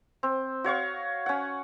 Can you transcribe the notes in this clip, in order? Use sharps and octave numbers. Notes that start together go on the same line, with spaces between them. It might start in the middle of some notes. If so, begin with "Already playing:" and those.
C4
F#4 C#5 F5 C#6
C#4 F#5